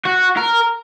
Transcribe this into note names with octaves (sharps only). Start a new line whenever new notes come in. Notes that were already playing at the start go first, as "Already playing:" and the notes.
F#4
A#4